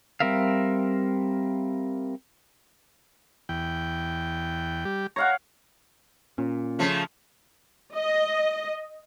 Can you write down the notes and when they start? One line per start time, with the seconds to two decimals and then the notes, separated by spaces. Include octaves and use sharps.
0.20 G3 C4 A#4 E5 F5
3.49 E2 G5
4.85 G3 G4
5.16 C#5 F5 F#5 A#5
6.38 A#2 C#4
6.79 C#3 F3 A3
7.94 D#5